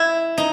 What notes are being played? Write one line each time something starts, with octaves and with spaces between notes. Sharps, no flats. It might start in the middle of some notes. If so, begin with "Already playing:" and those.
Already playing: E4
D#4